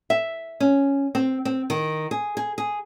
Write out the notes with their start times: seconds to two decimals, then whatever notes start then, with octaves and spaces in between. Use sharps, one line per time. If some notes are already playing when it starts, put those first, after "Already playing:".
0.10 E5
0.60 C#4
1.15 C4
1.45 C4
1.70 D#3
2.11 G#4
2.37 G#4
2.58 G#4